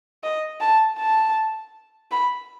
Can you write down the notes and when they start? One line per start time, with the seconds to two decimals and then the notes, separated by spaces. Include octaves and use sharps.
0.23 D#5
0.61 A5
0.99 A5
2.12 B5